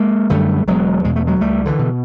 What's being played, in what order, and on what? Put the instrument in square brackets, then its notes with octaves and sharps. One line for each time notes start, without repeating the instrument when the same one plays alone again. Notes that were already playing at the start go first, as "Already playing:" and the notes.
Already playing: [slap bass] G#3 A#3
F#2 D3 G3 A3
E1 F#3 G#3
E2 B2 G#3
A3
F#3 G#3
C#2 G3 A3
D3 E3
B2